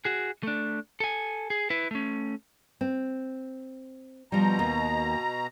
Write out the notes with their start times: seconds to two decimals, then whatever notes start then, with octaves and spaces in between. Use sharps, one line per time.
0.05 F#4 G#4
0.43 A3 D4
1.00 A4 G#5
1.50 G#4
1.70 E4 B4
1.91 A3 C#4
2.81 C4
4.32 B2 F3 G3 A#5
4.59 D#2